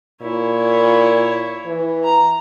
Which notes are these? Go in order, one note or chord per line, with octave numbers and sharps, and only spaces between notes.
A#2 E4 C#5
E3
A#5